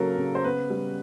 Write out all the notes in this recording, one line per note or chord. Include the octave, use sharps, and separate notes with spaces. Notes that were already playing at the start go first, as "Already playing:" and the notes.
Already playing: C#3 F#3 A#3 A4 A#4
C#3
C5
B3 B4
G3